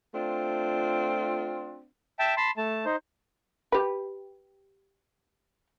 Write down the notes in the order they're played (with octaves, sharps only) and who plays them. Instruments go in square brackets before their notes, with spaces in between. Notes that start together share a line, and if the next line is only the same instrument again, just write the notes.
[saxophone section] A3 C4 D4 F4
[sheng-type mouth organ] E5 G5 A5
A5 B5 C6
A3 A5
D#4 C5
[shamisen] G4 B4